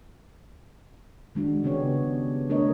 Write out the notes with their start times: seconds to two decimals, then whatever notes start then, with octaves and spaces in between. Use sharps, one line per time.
1.35 D#3 G#3 D4 F#4
1.63 C#3 B3 C#4 G4 G#4 C#5
2.49 F3 A3 D4 A#4 C#5 D#5